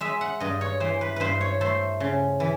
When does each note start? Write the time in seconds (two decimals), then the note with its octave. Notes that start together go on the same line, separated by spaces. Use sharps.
0.01 G#3 E5
0.21 F#5
0.40 G2 D#5
0.61 C#5
0.80 E3 C5
1.01 B4
1.16 G2 B4 C5
1.41 C#5
1.61 A3 C5
2.00 C#3
2.40 E3